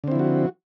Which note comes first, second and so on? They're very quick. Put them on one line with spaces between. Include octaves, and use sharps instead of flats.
D3 C4 E4 F3 F#4